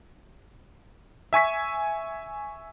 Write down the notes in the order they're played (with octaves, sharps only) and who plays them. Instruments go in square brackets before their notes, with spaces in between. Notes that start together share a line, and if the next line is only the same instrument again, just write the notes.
[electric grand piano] E5 G#5 C#6 B6